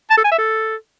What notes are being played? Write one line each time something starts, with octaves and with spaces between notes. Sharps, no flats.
A5
A4
G#5
E5
A4